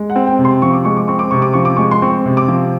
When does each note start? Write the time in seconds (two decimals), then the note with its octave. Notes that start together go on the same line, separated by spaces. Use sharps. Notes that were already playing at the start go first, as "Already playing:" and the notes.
Already playing: G#3
0.10 F#5
0.16 C4
0.27 G5
0.39 C3
0.45 C6
0.62 F3 C#6
0.73 D6
0.85 G#3 C#6
0.96 D6
1.08 C4 C#6
1.19 D6
1.31 C3 C#6
1.42 D6
1.53 F3 C#6
1.65 D6
1.77 G#3 C#6
1.91 C6
2.02 C4 C#6
2.25 C3
2.37 D6
2.48 F3